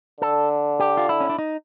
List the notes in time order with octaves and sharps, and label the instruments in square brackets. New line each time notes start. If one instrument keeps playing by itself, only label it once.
[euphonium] D3 [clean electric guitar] A4
[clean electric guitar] G4
F4
E4
C#4
D4
D#4